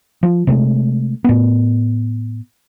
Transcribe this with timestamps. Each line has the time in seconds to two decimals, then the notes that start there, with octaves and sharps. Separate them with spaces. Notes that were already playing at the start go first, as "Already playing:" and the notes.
0.23 F3
0.47 C3 G#3 A3
1.24 A2 B3